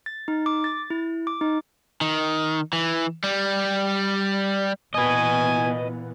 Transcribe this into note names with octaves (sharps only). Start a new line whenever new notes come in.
A6
D#4
D6
A6
E4
D6
D#4
D#3
E3
G3
A#2 E3 B3 B4 D#5 G#5